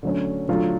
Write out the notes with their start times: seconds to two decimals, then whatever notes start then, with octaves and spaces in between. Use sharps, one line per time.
0.03 D3 F#3 A3 C#4
0.48 D3 F#3 A3 F4